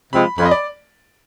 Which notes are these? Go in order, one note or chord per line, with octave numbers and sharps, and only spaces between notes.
C3 F3 G#3 C4 B5
F2 B5
D#5
D5